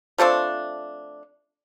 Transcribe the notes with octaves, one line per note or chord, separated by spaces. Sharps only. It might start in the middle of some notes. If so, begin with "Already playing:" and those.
F3 A3 C4 D4